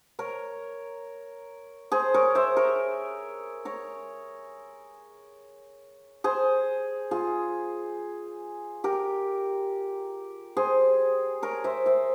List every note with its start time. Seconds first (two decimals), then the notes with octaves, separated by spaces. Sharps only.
0.19 A#4 C#5
1.92 G#4 C5
2.14 A#4 C#5
2.35 C5 E5
2.57 A#4 C#5
3.65 A#4 C#5
6.24 G#4 C5
7.11 F4 G#4
8.84 G4 A#4
10.57 G#4 C5
11.42 A#4 C#5
11.64 C5 E5
11.86 C5 E5